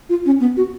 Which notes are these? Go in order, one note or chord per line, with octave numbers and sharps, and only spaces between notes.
F4
C#4
B3
F#4